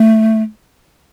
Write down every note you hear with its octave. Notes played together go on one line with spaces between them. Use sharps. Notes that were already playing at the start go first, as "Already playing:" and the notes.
Already playing: A3